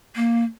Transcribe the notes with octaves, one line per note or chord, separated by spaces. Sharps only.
A#3